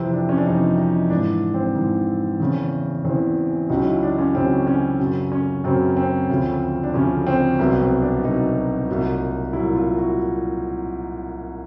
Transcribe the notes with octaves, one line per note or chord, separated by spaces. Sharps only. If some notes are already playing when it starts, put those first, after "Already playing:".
Already playing: F2 C3 E3 C4
D4
C#4
D4
F2 C3 E3 D#4
D#4
G#2 E3 D4
C4
G#2 E3
E2 C#3 E3
E2 C#3 E3 C4
C#2 C#3 F#3 D#4
E4
D4
C#4
C#2 C#3 F#3 C4
C#4
F#2 C#3 F#3
C#4
F#2 C#3 F#3 C4
C4
D2 C#3 F3
D4
D2 C#3 F3 C#4
C4
C2 B2 F#3 B3
C4
D4
C2 B2 F#3 D#4
C2 A#2 F#3
C2 A#2 F#3 E4
F4
F#4